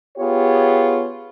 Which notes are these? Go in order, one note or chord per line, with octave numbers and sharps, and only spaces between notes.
B3 F4 G4 G#4 C#5